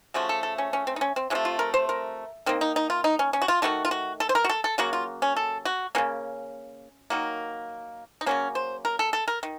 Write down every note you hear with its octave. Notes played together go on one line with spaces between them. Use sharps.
C#3 F3 A3 F#4
A4
A4
C#4
C#4
C4
D#4
C#4
C4
C3 F3 A3 C#4
F4
A#4
C5
A#4
D#3 A#3 C4
D#4
D#4
F4
D#4
C#4
C#4
F#4
F4
D#3 F#3 A3 F#4
F4
F#4
A4
C5
A#4
F#4
A4
A4
C#3 F#3 A#3 F#4
F4
C#4
A4
F#4
C#3 F#3 A#3 C#4
D#3 F#3 A#3
D#4
C#3 F#3 A#3 C#4
C5
A#4
A4
A4
A#4
D#3